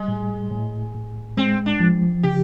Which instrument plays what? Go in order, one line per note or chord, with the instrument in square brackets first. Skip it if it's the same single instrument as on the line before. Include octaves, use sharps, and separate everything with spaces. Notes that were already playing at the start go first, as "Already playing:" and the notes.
Already playing: [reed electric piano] G3 [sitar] G#3
[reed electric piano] A2
A2
A2
[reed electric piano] G#3 [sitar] C4
[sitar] D4
[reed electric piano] F3
[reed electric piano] C#3 [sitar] G4